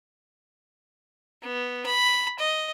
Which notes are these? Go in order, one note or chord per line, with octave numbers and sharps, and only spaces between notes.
B3
B5
D#5